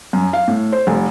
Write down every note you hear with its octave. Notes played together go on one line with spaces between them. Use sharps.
F#2
F5
A2
C5
F1